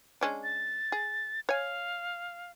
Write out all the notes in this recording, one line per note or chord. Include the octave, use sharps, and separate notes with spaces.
G#3 C#4 D4
A6
G#4
C#5 F5 G#5